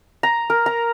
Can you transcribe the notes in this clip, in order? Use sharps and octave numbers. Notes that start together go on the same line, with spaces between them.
A#5
A#4
A#5